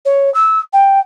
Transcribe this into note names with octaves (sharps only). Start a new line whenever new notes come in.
C#5
E6
G5